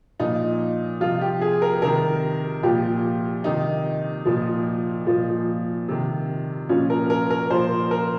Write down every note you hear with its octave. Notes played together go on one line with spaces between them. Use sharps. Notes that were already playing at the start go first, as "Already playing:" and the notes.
A#2 F3 D#4
C3 F3 F4
G4
G#4
A#4
C3 D#3 A#4
A#2 F3 G4
C3 D#3 D#4
A#2 F3
A#2 F3
C3 D#3
A#2 F3 C#4
A#4
A#4
A#4
A#2 F3 C5
A#4